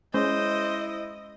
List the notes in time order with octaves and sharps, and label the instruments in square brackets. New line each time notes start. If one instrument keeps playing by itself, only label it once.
[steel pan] G#3 C#4 [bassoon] E4 [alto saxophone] C5 [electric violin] D#5